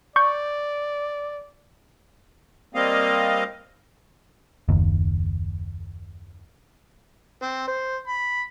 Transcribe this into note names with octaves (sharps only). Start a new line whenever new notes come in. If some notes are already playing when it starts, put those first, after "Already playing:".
D5 C#6 G6
G3 A#3 C4 D#5 F5
F#1 D#2
C4
C5
B5